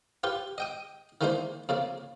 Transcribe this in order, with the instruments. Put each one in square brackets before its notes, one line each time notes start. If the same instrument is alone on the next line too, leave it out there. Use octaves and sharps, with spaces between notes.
[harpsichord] F4 G4 B4
D#5 G5 D#6
D#3 E3 G#3 A#3 D4 C5
F2 C#3 A#3